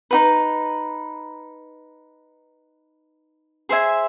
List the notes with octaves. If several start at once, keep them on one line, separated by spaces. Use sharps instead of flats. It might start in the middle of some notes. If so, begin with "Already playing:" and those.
D#4 F#4 B4
G#4 C5 E5 G#5